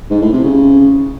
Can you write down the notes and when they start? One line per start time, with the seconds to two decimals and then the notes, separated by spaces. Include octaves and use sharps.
0.10 G#2
0.21 A2
0.33 C3
0.44 C#3